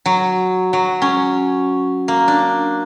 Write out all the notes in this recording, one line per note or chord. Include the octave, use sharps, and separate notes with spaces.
F#3
F#3
C#4
A#3
D4